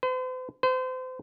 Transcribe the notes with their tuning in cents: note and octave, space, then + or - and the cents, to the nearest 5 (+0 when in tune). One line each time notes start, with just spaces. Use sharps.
C5 -45
C5 -35